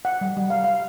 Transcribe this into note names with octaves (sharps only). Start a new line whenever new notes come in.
F#5
G3
G3
F5
F5